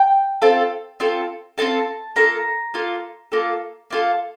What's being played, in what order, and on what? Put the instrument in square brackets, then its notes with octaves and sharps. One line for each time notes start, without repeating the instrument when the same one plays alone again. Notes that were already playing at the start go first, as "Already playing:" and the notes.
Already playing: [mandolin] G5
C4 F4 A4
C4 F4 A4
C4 F4 A4 A5
A#3 F4 A4 A#5
A#3 F4 A4
A#3 F4 A4
A#3 F4 A4